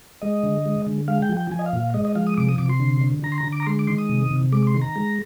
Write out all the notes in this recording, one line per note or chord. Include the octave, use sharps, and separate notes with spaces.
G#3 D#5
D3
G#3
D3
G#3 F5
G5
F3
G5
F3 G#5
D#5
F5
A#2
F5
G#3 D#5
D#5
F3 F5
D#6
C3 D6
D#6
C3 D6
C6
D3
D3
D3 A#5
C6
A#5
D3
D6
A#5
G#3 C6
D6
D#3 C6
D#6
C3
C3
G#3 D6
C6
D#3
A#5
G#3